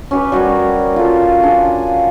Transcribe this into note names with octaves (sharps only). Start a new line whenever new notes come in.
C#4 G4 B4
G3 F#4 A#4 C#5
F4 A4
D4 G#4